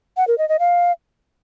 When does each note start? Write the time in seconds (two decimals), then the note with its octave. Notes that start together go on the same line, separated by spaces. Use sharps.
0.17 F#5
0.28 A#4
0.38 D#5
0.49 D#5
0.59 F5